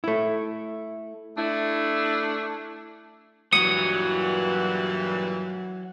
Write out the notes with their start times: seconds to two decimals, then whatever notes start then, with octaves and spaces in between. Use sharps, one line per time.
0.04 A3 E4
1.37 A3 D4 E4
3.53 G2 A#2 E3 F#3 D#6 C#7